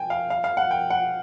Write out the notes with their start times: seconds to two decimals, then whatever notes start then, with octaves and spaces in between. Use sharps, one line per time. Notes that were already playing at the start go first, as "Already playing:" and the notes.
Already playing: G5 G#5
0.10 F5
0.30 F5
0.44 F5
0.57 F#5
0.71 G5
0.90 F#5